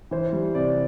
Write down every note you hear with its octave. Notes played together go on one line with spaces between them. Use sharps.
E3 C5
G3
C3 D5